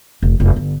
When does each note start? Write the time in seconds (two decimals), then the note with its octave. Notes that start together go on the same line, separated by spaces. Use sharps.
0.22 F1
0.40 F1
0.56 G1